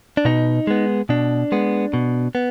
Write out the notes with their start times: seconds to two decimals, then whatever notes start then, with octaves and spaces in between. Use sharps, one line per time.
0.17 D4
0.25 B2 D#4
0.67 G#3 B3
1.09 B2 D4
1.52 G#3 B3
1.94 B2
2.35 B3